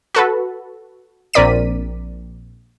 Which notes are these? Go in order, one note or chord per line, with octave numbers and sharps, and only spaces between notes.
F#4 A4 B4
A#1 C4 A#4 D5 B6 D#7